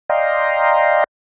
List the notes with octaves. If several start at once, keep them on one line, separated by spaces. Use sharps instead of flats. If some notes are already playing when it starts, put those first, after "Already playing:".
D5 D#5 F5 G5 A#5 C6